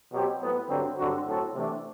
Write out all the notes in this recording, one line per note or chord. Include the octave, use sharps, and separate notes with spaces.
B2 F#3 C4 G4
A2 F#3 B3
G2 D3 F#3 C4
G2 D3 F#3 C4 F#4
A2 F#3 C4 F#4 A4
C3 E3 A3 D4